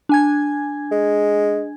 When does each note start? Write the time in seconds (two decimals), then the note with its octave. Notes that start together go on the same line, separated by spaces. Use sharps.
0.09 D4 G#5 G#6
0.91 G#3